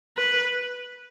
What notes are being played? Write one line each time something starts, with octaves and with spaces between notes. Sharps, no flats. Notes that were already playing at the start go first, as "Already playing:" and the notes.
B4